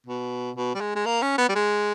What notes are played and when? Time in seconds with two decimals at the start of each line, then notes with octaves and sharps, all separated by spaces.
0.06 B2
0.56 B2
0.75 G3
0.81 G#3
0.95 G#3
1.06 A#3
1.22 C#4
1.38 B3
1.49 G3
1.55 G#3